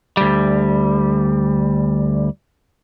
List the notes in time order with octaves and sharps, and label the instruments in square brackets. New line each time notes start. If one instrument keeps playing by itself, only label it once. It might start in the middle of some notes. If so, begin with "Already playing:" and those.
[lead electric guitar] D2 G3